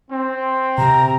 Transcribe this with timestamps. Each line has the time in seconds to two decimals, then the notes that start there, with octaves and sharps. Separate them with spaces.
0.11 C4
0.78 C3 A#5